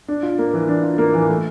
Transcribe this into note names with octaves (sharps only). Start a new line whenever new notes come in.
D4
F4
A#3
E3
D4
F4
A#3
E3
A3